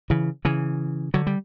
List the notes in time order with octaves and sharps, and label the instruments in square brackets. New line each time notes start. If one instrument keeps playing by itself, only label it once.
[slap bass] C#3 E3
C#3 E3
D3 F#3
G3